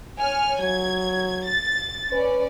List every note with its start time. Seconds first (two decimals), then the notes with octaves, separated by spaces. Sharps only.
0.20 C#5 G#5 F6
0.60 F#3 G#6
1.47 A6
2.12 C#4 B4 D5